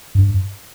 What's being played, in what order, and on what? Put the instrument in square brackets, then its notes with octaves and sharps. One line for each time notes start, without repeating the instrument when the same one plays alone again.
[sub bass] G2